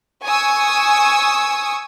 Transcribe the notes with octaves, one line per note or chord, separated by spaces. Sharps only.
G#5 C#6 D#6 E6